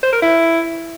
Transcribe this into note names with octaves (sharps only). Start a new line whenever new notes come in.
C5
A#4
E4